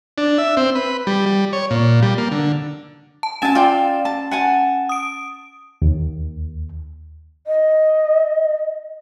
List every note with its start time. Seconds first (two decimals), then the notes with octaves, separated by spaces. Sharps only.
0.18 D4
0.38 E5
0.57 C4
0.75 B4
1.07 G3
1.26 G3
1.53 C#5
1.71 A#2
2.02 G3
2.18 A#3
2.31 D3
3.23 A5
3.42 C#4 G#5 A5 A6 E7
3.55 F4 D5 G5
4.05 A5
4.31 F#5 G#5 A5
4.89 D#6 D7
5.82 D#2
7.47 D#5